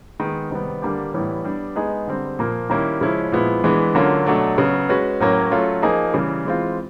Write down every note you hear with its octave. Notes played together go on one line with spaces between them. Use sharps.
D#3 G#3 B3
C3 D#3 G3 B3
D3 G3 A#3 D4 G4
A2 E3 G3 B3 E4
G3 B3 D4
G#3 B3 D#4 G#4
D3 G3 C4
A#2 F3 A#3
D#3 G3 A#3 C#4 E4
C#3 F3 G#3 C#4 E4
A#2 F3 G#3 B3 E4
E3 G#3 B3 D4
D3 F#3 A#3 C#4 F4
B2 F#3 A3 D4
C#3 F#3 B3
G#3 C#4 F#4 B4
A2 F#3 A#3 C#4
F#3 A3 C#4 F4
F3 A#3 D#4 G#4
C#3 E3 G3
E3 G#3 C4 F4